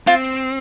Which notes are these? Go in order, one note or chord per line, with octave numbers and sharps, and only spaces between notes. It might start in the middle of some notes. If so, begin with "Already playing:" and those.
C4 F4